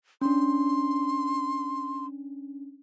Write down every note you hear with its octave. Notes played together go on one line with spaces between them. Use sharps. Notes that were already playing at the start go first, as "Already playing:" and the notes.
C#4 D4 C6